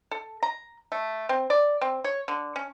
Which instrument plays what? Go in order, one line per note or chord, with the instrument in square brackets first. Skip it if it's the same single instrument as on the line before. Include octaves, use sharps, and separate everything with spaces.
[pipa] A4
A#5
A3
C4
D5
C4
C#5
D3
C#4